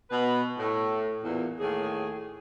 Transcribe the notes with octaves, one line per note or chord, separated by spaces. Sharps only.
B2 B4
A2
E2 A#2
D#2 A2 G#4